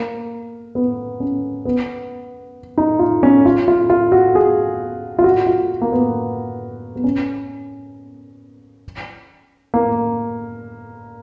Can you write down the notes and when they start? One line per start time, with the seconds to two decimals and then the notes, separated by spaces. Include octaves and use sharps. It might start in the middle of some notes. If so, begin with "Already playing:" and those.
Already playing: A#3
0.75 B3
1.20 C#4
1.65 B3
2.78 D#4
2.99 F4
3.23 C#4
3.45 F4
3.68 F4
3.90 F4
4.12 F#4
4.35 G#4
5.19 F4
5.24 F#4
5.46 F4
5.81 A#3
5.92 B3
6.96 B3
7.04 C#4
9.74 A#3